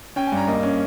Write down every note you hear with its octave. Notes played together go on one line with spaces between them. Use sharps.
C#4 G5
G#5
G2 A#5
A#3 D#5
C#4